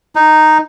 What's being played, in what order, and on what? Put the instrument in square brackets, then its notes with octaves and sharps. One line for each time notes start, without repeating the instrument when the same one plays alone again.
[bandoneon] D#4